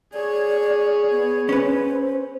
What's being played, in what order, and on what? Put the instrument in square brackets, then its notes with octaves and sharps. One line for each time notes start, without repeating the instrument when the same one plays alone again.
[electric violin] G#4 C#5 [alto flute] D5
[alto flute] B3
[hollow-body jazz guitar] C#4 B4 [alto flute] C5